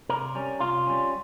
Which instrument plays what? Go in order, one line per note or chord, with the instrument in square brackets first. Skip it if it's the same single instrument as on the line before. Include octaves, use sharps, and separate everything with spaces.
[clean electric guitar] C3 A#4
G3 C#4
C3 F4
G3 C#4